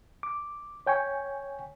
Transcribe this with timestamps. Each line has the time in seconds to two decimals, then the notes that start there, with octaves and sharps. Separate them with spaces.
0.23 D6
0.87 C#5 G5 G#5 C#6